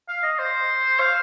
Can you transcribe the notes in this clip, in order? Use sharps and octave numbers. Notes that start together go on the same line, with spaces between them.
F5
D#5
C5
F5